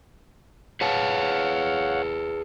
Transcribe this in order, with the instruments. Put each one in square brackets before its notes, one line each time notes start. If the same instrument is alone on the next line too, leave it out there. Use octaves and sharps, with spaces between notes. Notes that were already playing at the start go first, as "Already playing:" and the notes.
[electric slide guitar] G#4 B4 A5 [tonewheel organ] C#5 F5 F#5